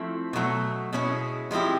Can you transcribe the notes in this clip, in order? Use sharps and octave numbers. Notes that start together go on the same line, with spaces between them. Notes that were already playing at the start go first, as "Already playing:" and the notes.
Already playing: F3 A3 C4 E4
B2 F#3 A3
B2 G#3 C#4 E4
F3 G#3 C4 E4 G4